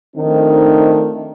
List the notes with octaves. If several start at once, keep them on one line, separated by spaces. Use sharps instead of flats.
D#3 F3 A3 C4 D4 D#4